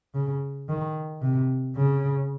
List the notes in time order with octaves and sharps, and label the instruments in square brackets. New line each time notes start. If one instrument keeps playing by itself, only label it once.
[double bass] C#3
D#3
C3
C#3